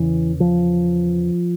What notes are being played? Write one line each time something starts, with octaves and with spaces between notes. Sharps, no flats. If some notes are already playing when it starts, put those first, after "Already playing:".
Already playing: E2 C#3 E3
F3